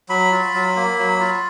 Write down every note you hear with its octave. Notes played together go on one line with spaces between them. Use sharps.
F#3 B5
F4
F#3
A#3
F#3
F4